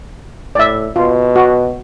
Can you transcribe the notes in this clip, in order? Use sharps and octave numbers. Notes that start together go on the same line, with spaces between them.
A2 D5 E5
B2 F4
F#4